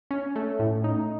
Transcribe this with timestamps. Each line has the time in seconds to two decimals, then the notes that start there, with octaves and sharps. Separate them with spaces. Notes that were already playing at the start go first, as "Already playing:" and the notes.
0.11 C#4
0.36 A3
0.59 A2
0.84 D#4